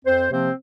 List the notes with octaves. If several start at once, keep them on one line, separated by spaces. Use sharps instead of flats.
F2 C4 C5
C3 F3 A#3 C4 C5